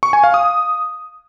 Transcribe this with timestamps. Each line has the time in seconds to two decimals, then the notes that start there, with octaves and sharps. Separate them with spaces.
0.03 C#6
0.13 G#5
0.24 F5
0.34 D#6